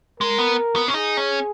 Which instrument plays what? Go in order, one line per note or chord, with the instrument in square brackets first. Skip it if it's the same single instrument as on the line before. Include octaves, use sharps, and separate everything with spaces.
[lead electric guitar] G#3 [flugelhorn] A#4
[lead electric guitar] B3
B3
C#4
[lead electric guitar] D#4 [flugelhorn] G#4
[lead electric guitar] C#4